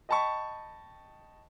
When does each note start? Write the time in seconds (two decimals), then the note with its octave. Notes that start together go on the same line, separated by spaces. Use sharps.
0.09 D#5 G5 A5 B5 C#6